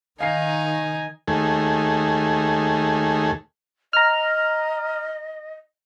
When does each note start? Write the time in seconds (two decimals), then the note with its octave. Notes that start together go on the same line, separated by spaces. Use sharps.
0.20 D#3 D#4 F5 G#5 C7
1.28 D#2 A3 G#4
3.93 D#5 A#5 F6